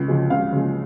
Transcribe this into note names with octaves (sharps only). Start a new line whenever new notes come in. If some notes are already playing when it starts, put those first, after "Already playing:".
Already playing: C#2
C#3 F3 G#3
C#2 F5
C#3 F3 G#3